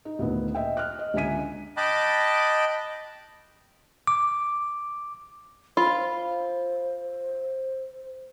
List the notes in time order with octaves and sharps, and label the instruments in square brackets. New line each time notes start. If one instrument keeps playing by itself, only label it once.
[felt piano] D#4
D2 A#2 D#3 B3
D#5 E5 G5
F6 F#6
D#5
C#2 D3 E5 G#5 B6 D#7
[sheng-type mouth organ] D#5 G5 A5 B5 D6 F#6
[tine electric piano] D6
[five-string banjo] F4 [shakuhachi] C5 [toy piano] B5